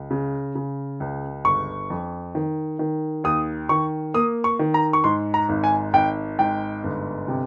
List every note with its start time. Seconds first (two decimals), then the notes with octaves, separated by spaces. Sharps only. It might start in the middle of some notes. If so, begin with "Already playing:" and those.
Already playing: C#2
0.11 C#3
0.55 C#3
1.00 C#2
1.45 G1 C#6
1.90 F2
2.35 D#3
2.79 D#3
3.24 D#2 D#6
3.69 D#3 C#6
4.14 A#3 D#6
4.44 C#6
4.59 D#3
4.74 A#5
4.93 C#6
5.04 G#2 C6
5.34 A#5
5.49 G#1
5.64 G#5
5.94 G#1 G5
6.39 G#2 G5
6.84 G1
7.28 C3